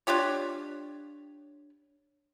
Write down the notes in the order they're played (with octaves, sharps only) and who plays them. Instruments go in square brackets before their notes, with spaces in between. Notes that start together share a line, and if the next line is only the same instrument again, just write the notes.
[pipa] D4 F4 G4 C#5